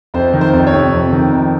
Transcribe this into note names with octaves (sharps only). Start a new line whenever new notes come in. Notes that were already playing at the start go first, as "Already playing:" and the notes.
F2 C5
D#3
C5
F2
C#5
C3
F2
D#3
F2